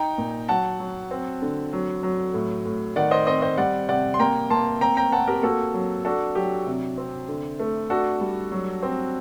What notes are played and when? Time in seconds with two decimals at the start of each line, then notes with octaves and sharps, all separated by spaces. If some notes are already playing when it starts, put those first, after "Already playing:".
Already playing: D#4 G5 A#5
0.18 A#2
0.49 F#3 F#5 A5
0.80 F#3
1.11 C4
1.42 D3
1.73 F#3
2.03 F#3
2.34 A2
2.65 A2
2.96 D#3 D5 F#5
3.11 C5 D#5
3.27 C4 C5 D#5
3.42 C5 D#5
3.58 G3 D5 F#5
3.88 C3 D5 F#5
4.14 C6
4.19 A#3 G5 A#5
4.50 A#3 A5 C6
4.81 C4 G5 A#5
4.97 G5 A#5
5.12 C4 F#5 A5
5.27 G4 A#4
5.43 A#3 F#4 A4
5.74 F#3
6.05 D4 F#4 A4
6.35 F#3 G4
6.67 C3
6.98 C4
7.28 D3
7.60 A3
7.90 D4 F#4 A4
8.21 G3
8.52 F#3
8.82 C4